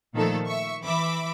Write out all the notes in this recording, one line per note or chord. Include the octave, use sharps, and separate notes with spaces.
A#2 D#3 F3 A3 A4
E5 C#6
E3 E5 B5 D6